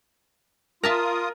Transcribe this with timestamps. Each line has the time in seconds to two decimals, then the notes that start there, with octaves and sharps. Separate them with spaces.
0.83 F4 A#4 E5 A5 A#5 D#6